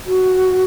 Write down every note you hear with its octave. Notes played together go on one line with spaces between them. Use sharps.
F#4